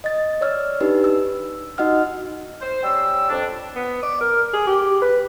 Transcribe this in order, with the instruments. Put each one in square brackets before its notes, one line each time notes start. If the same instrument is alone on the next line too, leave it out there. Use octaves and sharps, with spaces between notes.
[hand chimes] D#5 A6
C#5 D5 E6 F6
D4 D#4 G4 B4
E6
D#4 F#4 D#5 F#5 F6
[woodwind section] C5
G3 C#4 G5 E6
F2 D4
[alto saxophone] B3
D5
A#4
G#4
G4
B4